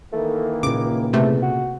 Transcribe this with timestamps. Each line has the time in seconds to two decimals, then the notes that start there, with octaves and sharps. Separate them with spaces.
0.12 D#3 E3 A3 A#3
0.63 C#2 A#2 C#3 D6
1.13 E2 C3 A3
1.42 F#4